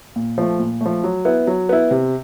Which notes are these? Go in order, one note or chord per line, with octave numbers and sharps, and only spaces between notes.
A#2
F3 A3
A#2
F3 A3
F#3
B3 E4
F#3
B3 E4
C3